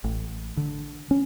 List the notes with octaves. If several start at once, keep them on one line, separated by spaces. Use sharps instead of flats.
A1
D3
C#4